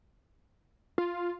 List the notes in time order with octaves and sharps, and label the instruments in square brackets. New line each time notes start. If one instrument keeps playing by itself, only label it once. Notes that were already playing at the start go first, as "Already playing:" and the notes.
[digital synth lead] F4